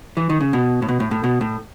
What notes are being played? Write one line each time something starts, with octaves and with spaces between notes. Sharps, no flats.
E3
D#3
C#3
B2
A2
B2
A2
A2
B2
A2